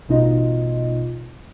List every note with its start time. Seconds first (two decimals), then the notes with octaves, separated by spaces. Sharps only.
0.09 A1 B2 D#4 F4 D#5